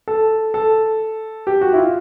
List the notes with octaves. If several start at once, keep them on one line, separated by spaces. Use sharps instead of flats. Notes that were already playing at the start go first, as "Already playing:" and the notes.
A4
A4
G4
F#4
E4
F4